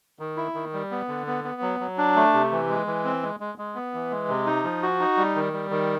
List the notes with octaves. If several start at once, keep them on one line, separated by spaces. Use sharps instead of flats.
D#3
E4
D#3
G3
B3
D3
B3
B3
F#3
F#3
D4
A3
C3
E3
G#3
E3
C4
G#3
G#3
G#3
B3
E3
G#3
C3
D#4
F3
F#4
D#4
G3
D#3
G3
D#3